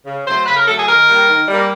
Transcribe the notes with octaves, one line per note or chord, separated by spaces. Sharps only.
C#3
F#3 A3 C5
C#3 B4
A#4
F#3 A3 A4
G#4
D#3 A#4
G3 A#3
D#3
G3 A#3